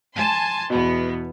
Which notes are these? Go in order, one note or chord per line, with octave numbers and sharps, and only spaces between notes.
G#5 A5 C6
E2 B2 B3